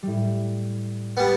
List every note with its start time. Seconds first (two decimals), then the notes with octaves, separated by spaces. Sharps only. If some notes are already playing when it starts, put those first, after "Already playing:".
0.03 A2 G3
1.17 G3 B3 A6